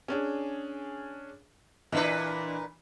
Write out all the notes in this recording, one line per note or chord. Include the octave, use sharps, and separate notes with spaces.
C#4 D4 G#4
A#2 E3 D4 B4 D#5 E5